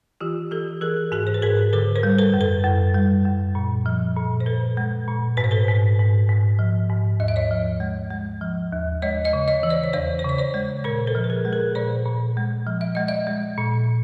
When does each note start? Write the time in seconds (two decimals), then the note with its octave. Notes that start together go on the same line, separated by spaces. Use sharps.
0.21 E3 F4 G4
0.51 E3 G4 A4
0.81 E3 G#4 A#4
1.12 G#2 F#4 G#4
1.27 C5
1.34 B4
1.42 G#2 G#4 A#4
1.73 D3 A4 B4
1.96 A#4 C5
2.03 G3
2.18 A4 B4
2.34 F#2
2.41 A4 B4
2.64 F#2
2.94 G3
3.25 F#2
3.55 A#2
3.86 F3
4.16 A#2
4.40 C5
4.46 A#2 A4 B4
4.77 G#3
5.08 A#2
5.37 G#2 B4
5.44 C5
5.51 A4 B4
5.68 G#2
5.99 G#2
6.29 G#2
6.59 F3
6.89 G#2
7.20 D#2 D#5
7.28 E5
7.36 C#5 D#5
7.51 F3
7.80 G#3
8.11 G#3
8.41 F3
8.72 D#2
9.02 G#3 C#5 D#5
9.25 C#5 D#5
9.33 C#3
9.48 C#5 D#5
9.63 E3
9.70 C5 D5
9.84 C#5
9.93 E2 C5 D5
10.19 C5
10.24 C#3 C#5
10.38 C5 D5
10.54 G#3
10.84 A#2 A#4 C5
11.07 A4 B4
11.15 F3
11.24 B4
11.30 G#4 A#4
11.45 G#3
11.52 G#4 A#4
11.75 A#2 C5 D5
12.06 A#2
12.37 G#3
12.67 F3
12.81 E5
12.95 G#3 D#5
13.08 D5 E5
13.27 G#3
13.58 A#2